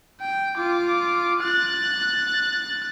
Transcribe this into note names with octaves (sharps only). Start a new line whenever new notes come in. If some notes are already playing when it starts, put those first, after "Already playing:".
G5
F4 D6
F#6 A6